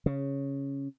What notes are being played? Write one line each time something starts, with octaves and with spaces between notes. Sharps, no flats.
C#3